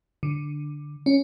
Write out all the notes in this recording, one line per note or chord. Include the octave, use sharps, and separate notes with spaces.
D3
C#4